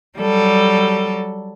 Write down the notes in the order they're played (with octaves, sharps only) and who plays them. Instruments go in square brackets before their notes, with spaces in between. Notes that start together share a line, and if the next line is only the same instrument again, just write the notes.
[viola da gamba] F#3 G3 A4